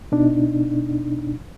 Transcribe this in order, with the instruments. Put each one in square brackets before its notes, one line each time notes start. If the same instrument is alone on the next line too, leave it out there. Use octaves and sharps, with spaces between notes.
[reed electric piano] B2 D4 D#4